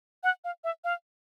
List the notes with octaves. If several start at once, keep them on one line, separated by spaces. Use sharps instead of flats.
F#5
F5
E5
F5